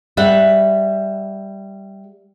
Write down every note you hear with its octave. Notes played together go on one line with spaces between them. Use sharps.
G3 E5 F#5